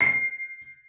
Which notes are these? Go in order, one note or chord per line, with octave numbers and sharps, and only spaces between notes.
C7